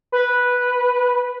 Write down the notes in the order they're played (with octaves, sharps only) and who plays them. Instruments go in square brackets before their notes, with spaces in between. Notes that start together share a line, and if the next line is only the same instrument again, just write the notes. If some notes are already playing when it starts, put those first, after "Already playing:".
[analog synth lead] B4